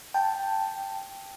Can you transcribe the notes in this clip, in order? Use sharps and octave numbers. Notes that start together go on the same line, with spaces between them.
G5 A5